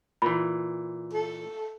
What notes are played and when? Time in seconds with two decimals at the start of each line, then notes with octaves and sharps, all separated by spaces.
0.22 A#2 E3 B5
1.13 A4